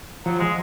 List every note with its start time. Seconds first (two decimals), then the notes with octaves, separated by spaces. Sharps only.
0.25 F3 F#3
0.39 G#3